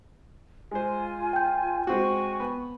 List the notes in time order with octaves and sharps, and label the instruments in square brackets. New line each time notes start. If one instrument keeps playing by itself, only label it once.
[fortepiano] G#3 C5 [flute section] F4 G#5
[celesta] G5 G6
[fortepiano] G#3 C4 F#4 [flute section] G#5 C#6
[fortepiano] B3